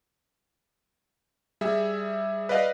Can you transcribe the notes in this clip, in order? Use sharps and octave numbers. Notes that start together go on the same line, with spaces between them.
G3 G#4 E5
B4 D5 D#5 F5